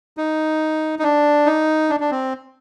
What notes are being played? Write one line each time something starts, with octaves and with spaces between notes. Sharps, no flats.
D#4
D#4
D4
D#4
D4
D4
C4